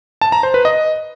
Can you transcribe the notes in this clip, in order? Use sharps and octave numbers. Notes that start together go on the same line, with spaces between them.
A5
A#5
C5
B4
D#5